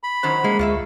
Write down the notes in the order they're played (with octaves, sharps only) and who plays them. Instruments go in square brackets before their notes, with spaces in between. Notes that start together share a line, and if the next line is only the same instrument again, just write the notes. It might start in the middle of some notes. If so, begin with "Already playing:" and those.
[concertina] B5
[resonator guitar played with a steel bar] D#3 F#3 C#4 [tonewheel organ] C5 F#5
[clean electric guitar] G#3 [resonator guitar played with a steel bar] A#3
[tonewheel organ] D2 C#6 [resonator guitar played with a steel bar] F4 D#5 E5